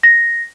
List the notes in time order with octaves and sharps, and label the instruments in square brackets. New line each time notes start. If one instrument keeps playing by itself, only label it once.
[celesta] A#6